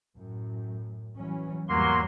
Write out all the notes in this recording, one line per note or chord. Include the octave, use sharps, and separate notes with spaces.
F#2 A2
E3 F#3 C#4
E2 G#2 F#3 G3 A#3 C6